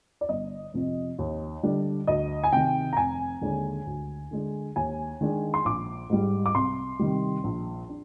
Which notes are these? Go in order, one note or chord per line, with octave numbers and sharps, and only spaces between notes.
D5
G1 D#5
F2 C3 F3
D#2
D3 G3 D4
D2 D#5
G#5
C3 D#3 G5
A#5
F1 G#5
D#2 D3 G#3 D4
D2
D3 G#3 D4
D#2 G#5
D#3 G#3 D4
C6
A#1 D6
G#2 G3
D6
C2 C6
C3 D#3 G3
A#1
D4